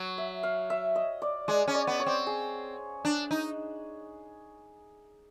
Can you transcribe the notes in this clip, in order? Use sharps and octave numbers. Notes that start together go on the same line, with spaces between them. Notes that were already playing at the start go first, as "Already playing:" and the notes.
Already playing: F#3
E5
F5
E5
D#5
D5
G#3 D5
C#4
D5
B3
C#5
C4
G#4
D4
D#4